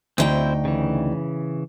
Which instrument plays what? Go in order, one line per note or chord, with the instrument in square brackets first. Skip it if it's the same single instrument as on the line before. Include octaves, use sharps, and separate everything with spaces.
[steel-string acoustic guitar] D2 D#4 G5 [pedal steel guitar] C4 E4 C5
[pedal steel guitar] C#3 E3